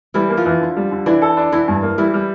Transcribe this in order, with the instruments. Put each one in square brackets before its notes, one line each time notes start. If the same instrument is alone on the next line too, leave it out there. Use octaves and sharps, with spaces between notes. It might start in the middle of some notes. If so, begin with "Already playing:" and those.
[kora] E3 E4 [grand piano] G3
[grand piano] A#3
[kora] F3 F4
[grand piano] E3
D3
G3
D3
[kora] E3 E4 [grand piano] D4
[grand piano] A4
D4
[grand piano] D3 [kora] E3 E4
[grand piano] G2
A#3
[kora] E3 E4 [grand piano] G3
[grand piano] G3